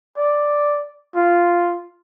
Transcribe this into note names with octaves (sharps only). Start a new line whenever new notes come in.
D5
F4